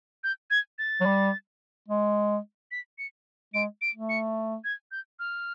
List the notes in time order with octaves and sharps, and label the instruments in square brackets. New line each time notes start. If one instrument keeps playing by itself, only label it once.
[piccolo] G6
G#6
A6
[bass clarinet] F#3
G3
G#3
[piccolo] B6
C#7
[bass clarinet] G#3 [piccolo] D7
[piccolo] D7
[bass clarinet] A3
[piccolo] C#7
G#6
G6
F6